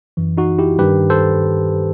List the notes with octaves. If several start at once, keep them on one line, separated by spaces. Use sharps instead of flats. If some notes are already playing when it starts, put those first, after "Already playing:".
F#2 E3
D#4 F#4
E4 G4
G2 D#3 G4 B4
A4 C5